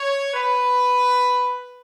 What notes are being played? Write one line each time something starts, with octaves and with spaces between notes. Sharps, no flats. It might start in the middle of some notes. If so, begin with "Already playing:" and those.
Already playing: C#5
B4